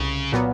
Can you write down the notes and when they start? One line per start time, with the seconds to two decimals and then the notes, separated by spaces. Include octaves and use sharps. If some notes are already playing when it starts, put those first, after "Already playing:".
Already playing: C2 C#3
0.32 A#2 F#3 B3